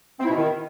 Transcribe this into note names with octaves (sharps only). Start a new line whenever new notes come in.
C4
E4
B2
D#3